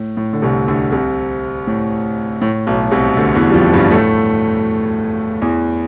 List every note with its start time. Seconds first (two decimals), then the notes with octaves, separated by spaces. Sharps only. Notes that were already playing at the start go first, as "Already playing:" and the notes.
Already playing: A2
0.17 A2
0.33 D3
0.42 C2 C3
0.68 D2 D3
0.92 C2 C3
1.67 A2
2.42 A2
2.67 B1 B2
2.91 C2 C3
3.17 D2 D3
3.35 E2 E3
3.50 G3
3.54 F2 F3
3.74 G2 G3
3.91 A2 A3
5.42 E2 E3